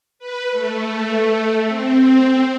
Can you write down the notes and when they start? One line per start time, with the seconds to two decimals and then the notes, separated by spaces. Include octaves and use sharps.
0.19 B4
0.52 A3
1.67 C4